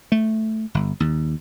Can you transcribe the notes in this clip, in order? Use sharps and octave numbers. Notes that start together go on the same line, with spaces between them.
A3
G1
D#2